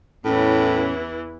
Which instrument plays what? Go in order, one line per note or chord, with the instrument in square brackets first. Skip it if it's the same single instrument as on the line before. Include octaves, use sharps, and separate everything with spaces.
[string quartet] E2 E3 E4 [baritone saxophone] A2 [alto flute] C#4